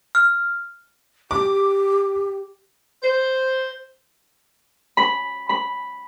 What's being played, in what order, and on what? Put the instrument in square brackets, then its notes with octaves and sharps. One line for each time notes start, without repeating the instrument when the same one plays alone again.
[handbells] F6
[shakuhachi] G4 [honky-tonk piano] D6
[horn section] C5
[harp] B5
B5